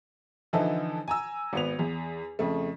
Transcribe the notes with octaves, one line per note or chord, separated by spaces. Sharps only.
D3 E3 F3 D#4 E4 A4
G#5 A#5 E6
G#1 B3 F7
E2
F2 C#3 A3